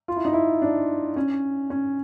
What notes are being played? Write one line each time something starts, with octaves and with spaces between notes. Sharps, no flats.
F4
E4
D#4
E4
D4
C#4
C#4